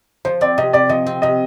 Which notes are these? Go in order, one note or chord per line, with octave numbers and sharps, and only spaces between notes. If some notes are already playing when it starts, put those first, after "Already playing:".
F3 C5
C4 D5
C3 D#5
C3 D5
F3 D#5
C4
C3 D#5